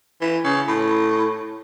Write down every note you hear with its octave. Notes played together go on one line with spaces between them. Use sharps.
E3
C#3
A2